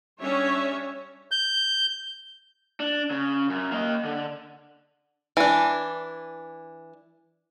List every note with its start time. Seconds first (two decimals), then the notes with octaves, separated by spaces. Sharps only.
0.21 G3 C#4 D4 C#5 E5
1.31 G6
2.80 D4
3.11 C#3
3.50 F#2
3.72 A#3 D#5
4.04 D3
5.37 E3 D4